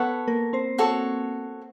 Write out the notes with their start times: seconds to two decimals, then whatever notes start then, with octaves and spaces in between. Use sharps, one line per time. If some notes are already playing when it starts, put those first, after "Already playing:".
Already playing: B3 A4 B4 C#5 F#5
0.27 A#3 A#4
0.53 C4 C5
0.78 F#4 A4 C#5